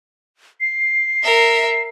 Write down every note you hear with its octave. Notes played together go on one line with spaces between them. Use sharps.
C7
A#4 E5